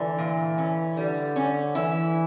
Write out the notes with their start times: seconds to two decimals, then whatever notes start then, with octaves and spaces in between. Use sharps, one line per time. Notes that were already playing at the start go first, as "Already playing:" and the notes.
Already playing: D3 E3
0.18 A#2
0.58 C#4
0.97 D3 G3
1.36 C#4
1.75 E3 E4